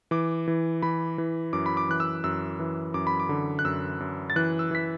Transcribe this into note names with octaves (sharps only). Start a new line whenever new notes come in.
E3 D6
E3
E3 B5
E3
F#2 D6
B5
D6
E3 F#6
E6
F#2 E6
E3
F#2 D6
B5
D6
D3
F#6
F#2 E6
F#2
A6
E3 F#6
E6
E3 B6